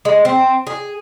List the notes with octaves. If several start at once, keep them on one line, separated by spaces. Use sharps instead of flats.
G#3
C4
G#4